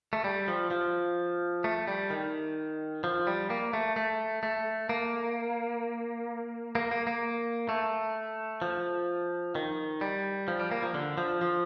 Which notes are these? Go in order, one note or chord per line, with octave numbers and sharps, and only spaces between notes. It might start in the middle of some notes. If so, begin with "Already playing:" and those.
A3
G3
F3
F3
A3
G3
D#3
F3
G3
A#3
A3
A3
A3
A#3
A#3
A#3
A#3
A3
F3
D#3
G3
F3
G3
A#3
F3
D3
F3
F3